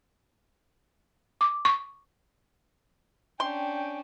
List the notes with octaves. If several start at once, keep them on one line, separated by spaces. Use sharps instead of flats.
D6
C#6
C#4 D4 G5 C6